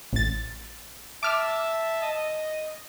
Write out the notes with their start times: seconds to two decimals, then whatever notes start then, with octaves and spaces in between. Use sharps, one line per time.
0.13 A1 A6
1.23 E5 A5 D6 F6
2.01 D#5 A5
2.15 D#5